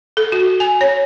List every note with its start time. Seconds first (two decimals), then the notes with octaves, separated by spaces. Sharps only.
0.17 A4
0.32 F#4
0.60 G#5
0.81 C#5